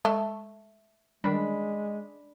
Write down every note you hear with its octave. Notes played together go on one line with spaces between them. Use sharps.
G#3 A3
D#3 E3 G3 G#3 D4 B5